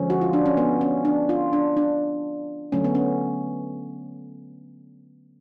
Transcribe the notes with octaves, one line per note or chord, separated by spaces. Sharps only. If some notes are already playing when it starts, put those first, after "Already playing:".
Already playing: D3 F3 G#3 C#4
F#4
F4
D4
C#4
B3
C#4
D4
F4
D4
D4
D3 F#3 A3 C#4
B3
C#4